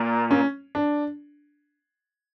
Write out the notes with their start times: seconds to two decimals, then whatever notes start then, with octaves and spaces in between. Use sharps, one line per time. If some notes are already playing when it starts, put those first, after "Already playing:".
Already playing: A#2
0.31 C#4
0.75 D4